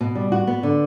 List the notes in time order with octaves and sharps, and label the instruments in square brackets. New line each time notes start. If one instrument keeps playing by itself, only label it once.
[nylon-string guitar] B2
G3
F#4
B3
D3